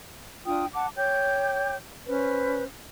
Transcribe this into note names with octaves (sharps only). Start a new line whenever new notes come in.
D4 F4 G5 D#6
F#5 A5 D6
C#5 G5 D6 G6
C#4 B4 C5 F6